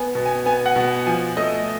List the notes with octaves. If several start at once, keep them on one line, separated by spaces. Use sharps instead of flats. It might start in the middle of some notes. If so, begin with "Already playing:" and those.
Already playing: B3 G#5
B2
G#5
B3 G#5
F#5
B2
F3 G#5
A3 D#5